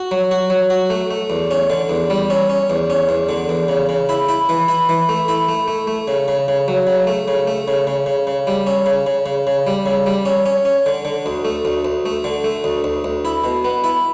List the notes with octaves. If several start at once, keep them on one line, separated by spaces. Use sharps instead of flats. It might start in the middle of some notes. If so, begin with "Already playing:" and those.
Already playing: F#4
F#3
F#4
F#3
F#4
A3
A3
E2
C#4
D3
E2
G3
C#4
C#4
E2
C#4
E2
D3
E2
C#3
C#3
E4
E4
E3
E4
E3
A3
E4
A3
A3
A3
C#3
C#3
C#3
F#3
C#3
A3
C#3
A3
C#3
C#3
C#3
C#3
G3
C#4
C#3
C#3
C#3
C#3
G3
C#3
G3
C#4
C#4
C#4
D3
D3
D2
A3
D2
D2
A3
D3
A3
D2
D2
D2
E4
B2
B3
E4